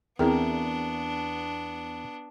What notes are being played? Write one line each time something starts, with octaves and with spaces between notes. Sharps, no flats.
E2 B3 C4 D4 E4 G#4 A#4 G5